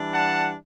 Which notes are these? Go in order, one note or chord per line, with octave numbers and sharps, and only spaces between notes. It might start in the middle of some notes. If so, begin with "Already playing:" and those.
Already playing: E3 G3 D4
F#5 A5